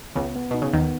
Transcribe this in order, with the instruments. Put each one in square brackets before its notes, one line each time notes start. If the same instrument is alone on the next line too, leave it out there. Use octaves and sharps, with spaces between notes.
[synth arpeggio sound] C#2 C#3 [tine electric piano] B3
[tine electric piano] B3
[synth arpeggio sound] B2 [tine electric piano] D#4
[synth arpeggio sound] C#3
[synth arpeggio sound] D#2 D#3 [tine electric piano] B3